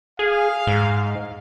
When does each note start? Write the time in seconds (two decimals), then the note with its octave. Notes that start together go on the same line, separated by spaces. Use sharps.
0.19 G#4 F5
0.67 G#2